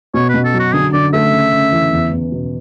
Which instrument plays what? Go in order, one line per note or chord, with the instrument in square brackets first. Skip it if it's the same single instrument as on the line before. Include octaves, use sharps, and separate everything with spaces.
[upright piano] B2 [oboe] C#5
[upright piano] B2 [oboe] B4
[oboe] A4
[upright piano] F#3
[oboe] F#4
[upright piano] D3 [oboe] G#4
[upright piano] D3 [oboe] D5
[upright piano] A3 [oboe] E5
[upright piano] C#3
C#3
E3
E2
E2
B2